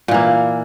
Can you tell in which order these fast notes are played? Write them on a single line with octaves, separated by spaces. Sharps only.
A#2 E3 A#3